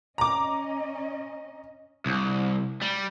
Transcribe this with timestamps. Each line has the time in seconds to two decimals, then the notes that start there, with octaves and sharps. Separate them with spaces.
0.18 C#4 D#5 A#5 D6
2.06 C2
2.82 G3